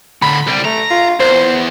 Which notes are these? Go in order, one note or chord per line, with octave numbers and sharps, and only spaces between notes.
A2 D3 B5
C2 G3
A3 A#5
F4
E2 C5